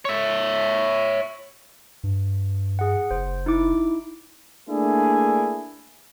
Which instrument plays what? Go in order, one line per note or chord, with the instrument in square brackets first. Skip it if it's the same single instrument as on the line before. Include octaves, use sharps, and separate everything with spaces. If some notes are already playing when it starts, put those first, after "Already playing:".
[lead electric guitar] C#5 E5
[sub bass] G2
[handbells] G#4 F#5
[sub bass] F#1 [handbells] C5
[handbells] D#4 E4 D6
[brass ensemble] A3 A#3 D4 E4 G#4